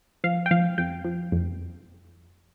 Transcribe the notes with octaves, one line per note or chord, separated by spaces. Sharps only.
F3 F5
G5
F3 F5
F2 G5
F3
F2